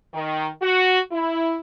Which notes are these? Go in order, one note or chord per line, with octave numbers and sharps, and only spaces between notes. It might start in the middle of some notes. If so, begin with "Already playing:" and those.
D#3
F#4
E4